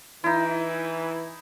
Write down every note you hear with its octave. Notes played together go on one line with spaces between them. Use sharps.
E3 D#4 E4